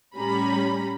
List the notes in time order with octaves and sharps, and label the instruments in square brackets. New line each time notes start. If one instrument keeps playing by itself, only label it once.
[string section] A2 G3 C#4 A#5 B5